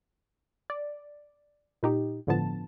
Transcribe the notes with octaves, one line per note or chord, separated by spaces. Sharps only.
D5
A#2 D#4 G4
G1 A2 D3 F3 B3 A5